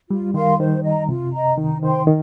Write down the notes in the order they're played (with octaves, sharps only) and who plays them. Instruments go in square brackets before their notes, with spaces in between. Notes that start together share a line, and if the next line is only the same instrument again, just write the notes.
[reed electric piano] G3 [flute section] F4
[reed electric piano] D#3 [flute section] A#4 F5 C6
[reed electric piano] D#3 [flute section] C5
[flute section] D#5 A#5
[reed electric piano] C3 [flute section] F4
[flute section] D#5 A#5
[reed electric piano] D#3 [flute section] D#4
[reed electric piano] D#3 [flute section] C5 G5 C6
[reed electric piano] D#3 [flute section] A#4